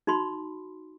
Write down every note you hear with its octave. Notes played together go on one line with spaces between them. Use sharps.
D#4 F#4 B5 C6